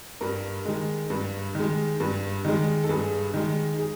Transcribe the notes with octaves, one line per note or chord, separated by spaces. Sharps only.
G2 A#4
D#3 G#3
G2
D#3 G#3
G2
D#3 G#3
A4
G2 G#4
D#3 G#3
G#4